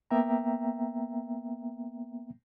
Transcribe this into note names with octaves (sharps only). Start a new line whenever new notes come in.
A#3 B3 E5 G5 A#5